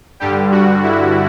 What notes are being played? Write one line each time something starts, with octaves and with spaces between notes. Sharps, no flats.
G2 D3 G3 G4
F#4
E4